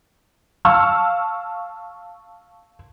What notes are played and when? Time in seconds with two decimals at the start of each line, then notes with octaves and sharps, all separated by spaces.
0.65 F5 A5 C#6 E6 F6